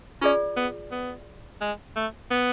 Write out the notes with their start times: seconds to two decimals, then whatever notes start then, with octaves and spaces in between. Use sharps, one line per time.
0.21 C#4 F4 G#4 D5
0.56 B3
0.92 B3
1.61 G#3
1.96 A3
2.31 B3